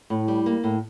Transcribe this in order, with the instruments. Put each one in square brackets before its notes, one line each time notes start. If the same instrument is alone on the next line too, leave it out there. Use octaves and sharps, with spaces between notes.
[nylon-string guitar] A2
G3
A#3
A2